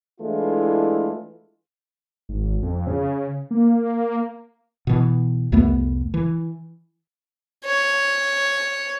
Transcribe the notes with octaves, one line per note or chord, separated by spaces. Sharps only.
E3 G#3 A3 D4 E4 F4
G#1
F2
C#3
A#3
B2 E3
C2 F2 A3 B3
E3
C#5